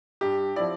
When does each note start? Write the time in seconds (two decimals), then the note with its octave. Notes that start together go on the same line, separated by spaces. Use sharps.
0.21 G2 G4
0.56 F3 C4 E4 D5